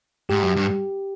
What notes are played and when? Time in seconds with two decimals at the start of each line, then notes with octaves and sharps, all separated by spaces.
0.30 G#2 G4
0.43 F#2
0.56 G2